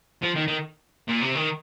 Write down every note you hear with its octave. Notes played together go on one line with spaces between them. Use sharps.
F3
D#3
D#3
A#2
C3
D#3